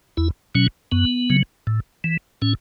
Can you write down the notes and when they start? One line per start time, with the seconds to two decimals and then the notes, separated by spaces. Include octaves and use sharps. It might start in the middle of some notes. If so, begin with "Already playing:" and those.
0.17 E2 E4
0.55 B2 F#3 C#4
0.92 F#2 B3
1.30 C#3 F#3
1.67 A2
2.04 E3
2.42 A2 C#4